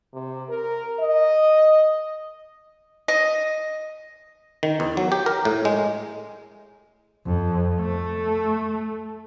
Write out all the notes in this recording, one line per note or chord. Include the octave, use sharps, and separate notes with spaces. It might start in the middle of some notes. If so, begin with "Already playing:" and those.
C3
A#4
D#5
D#5
D#3
E2
F#3
G4
A#4
A2
G#3
F2
A3